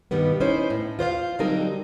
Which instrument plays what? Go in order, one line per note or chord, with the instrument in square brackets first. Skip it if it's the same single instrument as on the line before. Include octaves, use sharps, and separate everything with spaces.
[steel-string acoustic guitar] G2 B2 D#3 G3 B3
C#4 D#4 E4 C5
A2
F4 C5 D5 F5
D3 F#3 G3 C4 D#4 A#4